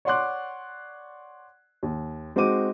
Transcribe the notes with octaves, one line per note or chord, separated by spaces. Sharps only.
C#5 D5 F#5 C6 D6 F#6
D#2
G#3 C4 D#4 F#4 D6 D#7